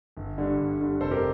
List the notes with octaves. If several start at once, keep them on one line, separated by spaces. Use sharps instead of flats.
G1
G2 D3 G3
G1
G2 D3 G3
F1 A4 C5
G4 A#4